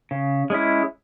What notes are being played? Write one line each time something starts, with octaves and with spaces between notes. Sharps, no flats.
C#3
G#3 C#4 E4